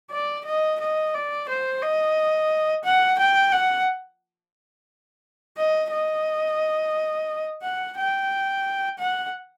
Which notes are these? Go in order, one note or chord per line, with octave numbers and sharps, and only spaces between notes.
D5
D#5
D#5
D5
C5
D#5
F#5
G5
F#5
D#5
D#5
F#5
G5
F#5